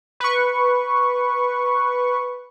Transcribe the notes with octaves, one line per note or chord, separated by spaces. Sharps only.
B4 C#6